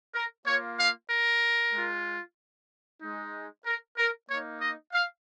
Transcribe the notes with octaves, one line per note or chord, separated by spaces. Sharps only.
A#4
A#3 F4 C#5
F5
A#4
G#3
F4
G#3 D#4
A#4
A#4
A#3 D#4 C#5
D#5
F5